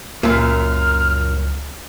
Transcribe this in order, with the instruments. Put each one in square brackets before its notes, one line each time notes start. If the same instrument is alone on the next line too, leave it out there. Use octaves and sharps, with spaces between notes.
[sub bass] C#2 [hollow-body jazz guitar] F#2 A#2 [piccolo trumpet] F6